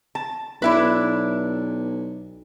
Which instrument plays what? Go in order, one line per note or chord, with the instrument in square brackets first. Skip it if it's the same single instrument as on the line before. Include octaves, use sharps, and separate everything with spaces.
[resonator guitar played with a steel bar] A5
[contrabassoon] B1 [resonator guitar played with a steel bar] D4 E4 B4